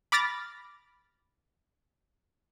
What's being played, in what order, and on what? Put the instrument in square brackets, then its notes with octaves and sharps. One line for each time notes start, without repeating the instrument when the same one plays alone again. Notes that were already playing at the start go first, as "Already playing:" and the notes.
[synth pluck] B5 D6 F6 A6 A#6